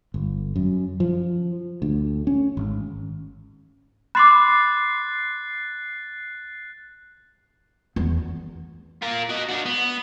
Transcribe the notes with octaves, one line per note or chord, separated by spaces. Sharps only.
G1
F#2
F3
D2
C#4
G#1
B5 C6 D6 F#6 A6 C7
E2
F4 A#4
F#4 D#5
D4 F#4
B3